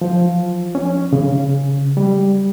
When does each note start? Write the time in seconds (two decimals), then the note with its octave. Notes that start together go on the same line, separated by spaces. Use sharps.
0.01 F3
0.75 C#4
1.13 C#3
1.97 G3